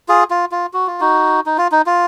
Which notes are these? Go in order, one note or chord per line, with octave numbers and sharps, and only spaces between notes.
F4 G#4
F4
F4
F#4
F4
D#4 F#4
D#4
F4
D#4
F4